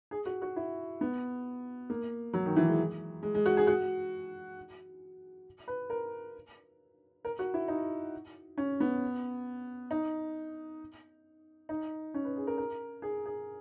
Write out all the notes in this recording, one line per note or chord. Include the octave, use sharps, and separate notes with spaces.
G#4
F#4
F#4
E4
B3
A#3
F#3
D#3
E3
G#3
G#3
G#3
F#4
G#4
F#4
B4
A#4
A#4
F#4
E4
D#4
C#4
B3
D#4
D#4
C#4
B4
G#4
A#4
A#4
G#4
G#4